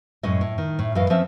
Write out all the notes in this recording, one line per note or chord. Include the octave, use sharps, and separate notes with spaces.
F#2 A2 G#3 C#4 D#5
A2
D#3
A2
F#2 A2 E3 D#5 F5
F3 C4 C#4 E5